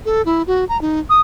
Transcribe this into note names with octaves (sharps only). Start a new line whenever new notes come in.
A4
E4
F#4
A#5
D#4
D#6